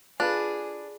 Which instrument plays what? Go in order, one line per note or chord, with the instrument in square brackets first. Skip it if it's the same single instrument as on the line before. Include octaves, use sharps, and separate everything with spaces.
[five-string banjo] D4 [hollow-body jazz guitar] F4 A4 B4 [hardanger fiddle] G#4